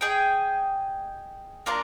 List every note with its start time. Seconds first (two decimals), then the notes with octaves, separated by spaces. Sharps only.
0.01 G#4 D#5 G5
1.66 A#3 D4 F4 A#4